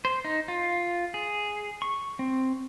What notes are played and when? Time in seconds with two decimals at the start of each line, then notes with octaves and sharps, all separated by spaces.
0.05 C5
0.25 D#4
0.48 F4
1.14 G#4
1.82 C#6
2.19 C4